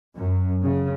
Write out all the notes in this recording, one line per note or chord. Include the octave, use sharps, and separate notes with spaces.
F#2
C#3